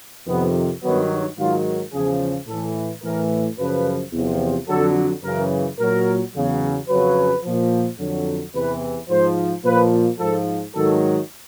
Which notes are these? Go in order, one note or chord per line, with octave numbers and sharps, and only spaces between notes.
F2 C3 D#3 B3
G2 D#3 F#3 B3
G#2 D#3 F#3 F4
E2 C#3 F3 G#4
A2 E3 A4
A2 E3 A#4
F#2 C#3 F3 B4
E2 C3 F3
F2 D3 F#3 A4
F#2 C#3 E3 A#4
A#2 F#3 A#4
E2 C#3 F#3
F2 C#3 F#3 B4
A#2 F3
F2 D3 F#3
E2 C3 E3 B4
G#2 F3 C5
A#2 F3 B4
G#2 F3 A4
G#2 D#3 F#3 A4